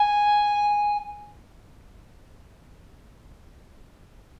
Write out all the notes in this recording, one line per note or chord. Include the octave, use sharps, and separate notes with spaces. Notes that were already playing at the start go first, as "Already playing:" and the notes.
Already playing: G#5